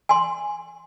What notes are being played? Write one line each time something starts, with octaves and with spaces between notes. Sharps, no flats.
G#5 C6